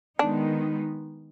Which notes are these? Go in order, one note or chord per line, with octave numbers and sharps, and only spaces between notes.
D#3 G#3 B3 D4 D#4